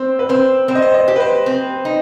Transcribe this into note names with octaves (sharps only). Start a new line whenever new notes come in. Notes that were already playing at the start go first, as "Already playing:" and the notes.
Already playing: C4 C5
B4
C4 C5
C4 C5
D#5
C5
D#5
G4
B4
C5
C4
D#4